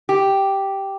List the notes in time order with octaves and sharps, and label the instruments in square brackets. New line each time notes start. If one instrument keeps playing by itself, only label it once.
[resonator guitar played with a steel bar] G4